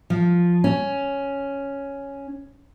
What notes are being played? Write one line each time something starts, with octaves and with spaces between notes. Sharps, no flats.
F3
C#4